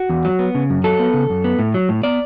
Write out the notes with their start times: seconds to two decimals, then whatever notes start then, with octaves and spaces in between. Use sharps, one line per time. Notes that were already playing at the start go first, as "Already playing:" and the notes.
Already playing: F#4
0.09 E2
0.25 F#3
0.39 B3
0.55 C#3
0.70 F#2
0.84 F#3 A4
0.99 B3
1.14 C#3
1.30 F#2
1.44 B3
1.59 A2
1.74 F#3
1.89 A2
2.03 B3 D5